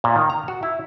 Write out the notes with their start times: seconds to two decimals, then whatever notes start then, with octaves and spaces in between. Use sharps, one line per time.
0.04 A#2
0.16 D#3
0.30 A#5
0.48 F#4
0.63 E4